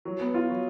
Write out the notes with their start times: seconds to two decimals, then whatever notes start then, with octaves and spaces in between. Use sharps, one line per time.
0.05 F#3
0.20 B3
0.34 F4
0.50 F#3